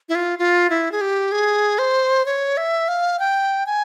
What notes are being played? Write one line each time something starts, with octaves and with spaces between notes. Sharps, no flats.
E4
F4
F4
E4
G#4
G4
G#4
C5
C#5
E5
F5
G5
G#5